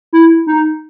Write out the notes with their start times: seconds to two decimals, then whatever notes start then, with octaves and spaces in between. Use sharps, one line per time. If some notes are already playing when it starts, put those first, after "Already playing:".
0.13 E4
0.47 D#4